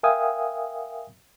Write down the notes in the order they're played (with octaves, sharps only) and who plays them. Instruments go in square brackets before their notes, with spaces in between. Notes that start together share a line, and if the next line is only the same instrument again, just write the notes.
[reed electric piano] A#4 E5 F5 G5 G#5 D#6